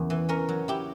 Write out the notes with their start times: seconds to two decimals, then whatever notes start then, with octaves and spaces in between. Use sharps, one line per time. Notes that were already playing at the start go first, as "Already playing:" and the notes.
Already playing: E2 C#3 A#3
0.10 E3
0.29 C#4 A#4
0.49 F#3
0.68 E4 G4